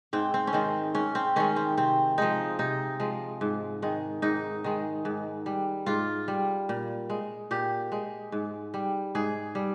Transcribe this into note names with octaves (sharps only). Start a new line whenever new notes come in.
G#2 C4
C4
C#4
D#3 G#3 C4
G#2 C#4
C4
D#3 G#3 C#4
C4
C3 C4
F3 G#3 D#4
C3 D#4
F3 G#3
G#2
D#3 G#3
G#2 D#4
D#3 G#3
G#2
G3
G#2 F4
G3
A#2
G#3
A#2 G4
G#3
G#2
G3
G#2 G#4
G3